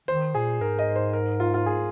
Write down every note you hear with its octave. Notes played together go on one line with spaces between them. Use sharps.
D#3 C5
A#2 G#4
G#2 A#4
D#5
C5
A#4
F4
F4
G#4